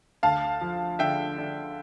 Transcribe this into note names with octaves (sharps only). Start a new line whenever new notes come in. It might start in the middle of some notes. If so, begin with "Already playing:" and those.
D2 F5 A5
F3
D3 E5 G5
D3